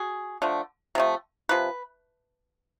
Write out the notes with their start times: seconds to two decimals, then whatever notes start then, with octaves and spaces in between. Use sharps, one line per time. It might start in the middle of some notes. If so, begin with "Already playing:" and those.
Already playing: F#4 G#4
0.42 D3 F3 A3
0.95 C3 F3 A3
1.49 C3 F3 B4